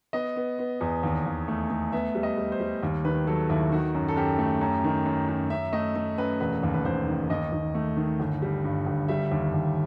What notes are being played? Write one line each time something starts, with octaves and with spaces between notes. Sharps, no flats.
B3 D#5
B3
B3
E2
D#2
D#2
A3
A3
B3 E5
G3
D#5
G3
C5
G3
D#2
D#3 B4
F#3 A4
D#2 E4
D#3 F#4
F#2
A4
F#2 G4
A3
F#2
D#3
F#2
F#2
F#2 E5
A3 D#5
A3
F#2 B4
E1 B4
D#2
B4
D#2 C5
D#3
D#2 D#5
D#2
A3
D#3
G1
G3
G2
G1
G3 E5
D#2
D#2